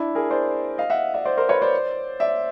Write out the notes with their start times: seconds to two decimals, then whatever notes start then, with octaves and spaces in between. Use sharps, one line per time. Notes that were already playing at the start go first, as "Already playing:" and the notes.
Already playing: D4 E4
0.15 G#4 A#4
0.31 C5 D5
0.78 D#5 F5
0.90 E5 F#5
1.14 D5 E5
1.25 C5 D5
1.37 A#4 C5
1.49 B4 C#5
1.62 C5 D5
2.20 D5 E5